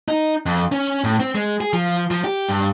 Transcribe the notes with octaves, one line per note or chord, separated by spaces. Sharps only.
D#4
F2
C#4
A2
C4
G#3
G#4
F3
F3
G4
G2